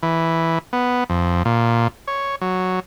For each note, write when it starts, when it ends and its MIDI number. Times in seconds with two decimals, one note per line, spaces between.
0.03 0.59 52
0.73 1.04 59
1.10 1.43 41
1.45 1.88 46
2.08 2.36 73
2.41 2.80 54